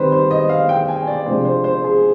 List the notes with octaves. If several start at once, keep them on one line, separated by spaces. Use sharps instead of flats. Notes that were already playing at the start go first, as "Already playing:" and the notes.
Already playing: D#3 G3 C4 B4 C5
C5
D#5
F5
G5
G#5
D5
C3 F3 G#3 D4 F4 C5
C5
C5
G#4